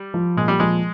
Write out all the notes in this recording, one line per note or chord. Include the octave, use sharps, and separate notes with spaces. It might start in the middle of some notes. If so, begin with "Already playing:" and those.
Already playing: G3
F3
A#2 G#3
G3
F3 G#3